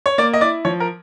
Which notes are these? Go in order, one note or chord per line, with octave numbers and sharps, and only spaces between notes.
C#5
A#3 D5
D#5
E4 D5
F3 C#5
A#4